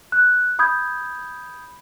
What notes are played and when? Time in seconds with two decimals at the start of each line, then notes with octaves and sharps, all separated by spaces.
0.12 F#6
0.59 B5 D#6 G6 G#6